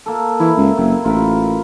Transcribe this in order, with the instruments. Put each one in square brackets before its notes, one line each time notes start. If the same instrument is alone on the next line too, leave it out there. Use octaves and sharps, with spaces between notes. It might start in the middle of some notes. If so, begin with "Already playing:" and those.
[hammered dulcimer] A#3 A4
[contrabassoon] E3 [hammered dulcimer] E4
[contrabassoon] C#2
[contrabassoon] F#1 [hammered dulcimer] C3
[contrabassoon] A1 [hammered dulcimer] F4 A#4 B4